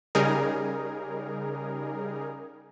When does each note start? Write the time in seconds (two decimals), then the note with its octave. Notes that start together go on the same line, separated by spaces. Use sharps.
0.15 C#3 G3 D#4 G#4 A#4